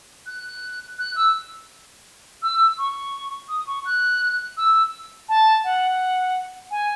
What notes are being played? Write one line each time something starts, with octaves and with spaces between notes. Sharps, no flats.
F#6
F#6
E6
E6
C#6
D#6
C#6
F#6
E6
A5
F#5
G#5